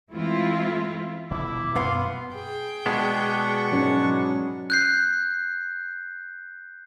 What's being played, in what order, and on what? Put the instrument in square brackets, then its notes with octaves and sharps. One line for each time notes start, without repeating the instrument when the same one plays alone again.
[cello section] E3 G#3 A3 C4 E4 F4
[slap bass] D#1 B2 B3 [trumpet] E4 [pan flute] D6
[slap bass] F#2 [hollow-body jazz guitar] B2 B3 F5 [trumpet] C6
[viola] G#4 G5
[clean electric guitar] B2 G#3 B3 [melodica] D4 F#5 C#6
[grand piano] G#2 F#3 C#4
[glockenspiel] F#6 G6 C7